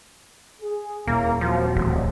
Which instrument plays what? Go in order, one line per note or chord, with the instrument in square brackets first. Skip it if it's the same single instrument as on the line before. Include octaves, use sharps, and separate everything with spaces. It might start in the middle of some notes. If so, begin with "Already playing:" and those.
[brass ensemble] G#4
[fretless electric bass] D#1 [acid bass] A#3 [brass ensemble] C#4 E4 A#5
[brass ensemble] C3 F#3 [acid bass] F3
[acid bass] D1 [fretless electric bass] E2 A2